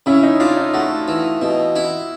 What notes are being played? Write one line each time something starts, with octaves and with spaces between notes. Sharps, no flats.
C#3 E4
D#4
D4 F4
D#4
A3 F#4
E3
B2
E4